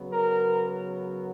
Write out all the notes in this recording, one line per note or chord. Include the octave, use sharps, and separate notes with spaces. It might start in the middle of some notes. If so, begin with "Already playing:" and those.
Already playing: C#3 F#3 B3
A#4